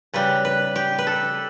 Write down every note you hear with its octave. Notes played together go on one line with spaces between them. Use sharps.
C#3 G3 B4
B4
G4
B4
A4